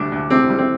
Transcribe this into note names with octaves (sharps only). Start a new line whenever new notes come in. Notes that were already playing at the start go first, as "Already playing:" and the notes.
Already playing: D2 G3 D4
D2
C3 C4
G3
C4